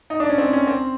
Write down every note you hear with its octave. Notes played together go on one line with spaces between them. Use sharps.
D#4
D4
C#4
C4
C#4
C4